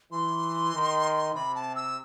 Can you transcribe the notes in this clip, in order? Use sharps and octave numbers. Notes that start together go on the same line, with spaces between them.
E3 C6
D#3
C3 B5
A5
E6